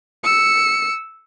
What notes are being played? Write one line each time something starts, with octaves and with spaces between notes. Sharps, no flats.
E6 C#7